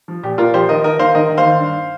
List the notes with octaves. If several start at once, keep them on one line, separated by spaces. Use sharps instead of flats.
F3
A#2 G4
A#2 F4 A#4
F3 G4 C5
D#3 A#4 D#5
D#3 A#4 D#5
D#3 C5 F5
D#3 A#4 D#5
D#3
C5 F5
D#2
G2